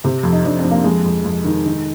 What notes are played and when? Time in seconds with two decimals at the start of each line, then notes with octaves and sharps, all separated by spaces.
0.04 C3 C4
0.23 F2
0.32 D#4
0.45 F2 D4
0.59 F2 C4
0.71 A#3
0.84 F2 G#3
1.04 F2
1.24 F2
1.44 D#3
1.66 D#3